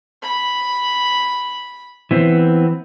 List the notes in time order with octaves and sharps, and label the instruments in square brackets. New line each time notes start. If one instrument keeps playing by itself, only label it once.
[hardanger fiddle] B5
[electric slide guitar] E3 B3 C4